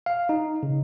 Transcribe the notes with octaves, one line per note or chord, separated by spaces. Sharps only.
F5
D#4
C#3